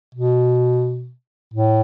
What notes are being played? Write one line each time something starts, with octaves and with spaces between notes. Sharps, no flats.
B2
A2